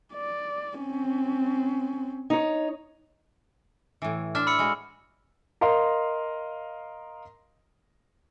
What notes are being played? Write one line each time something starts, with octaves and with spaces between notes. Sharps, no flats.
D5
C4 C#4
D#4 C#5
A2 E3
D4 C5 E5 F6
B5 E6 C#7
G#3 F#4
A#4 D#5 F5 C6